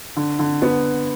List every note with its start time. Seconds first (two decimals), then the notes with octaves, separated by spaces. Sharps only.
0.16 D3
0.39 D3
0.62 B3